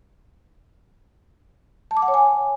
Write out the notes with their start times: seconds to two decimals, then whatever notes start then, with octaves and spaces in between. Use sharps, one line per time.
1.91 A5
1.97 D6
2.02 F#5
2.08 C#5
2.14 G#5